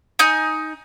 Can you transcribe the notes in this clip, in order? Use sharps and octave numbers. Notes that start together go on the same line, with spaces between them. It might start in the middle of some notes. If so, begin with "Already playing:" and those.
D#4 G#5 G6